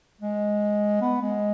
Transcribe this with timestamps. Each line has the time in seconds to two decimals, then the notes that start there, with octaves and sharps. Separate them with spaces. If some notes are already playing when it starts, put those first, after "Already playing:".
0.21 G#3
1.01 B3
1.22 G#3